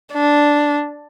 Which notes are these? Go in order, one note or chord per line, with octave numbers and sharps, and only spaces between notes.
D4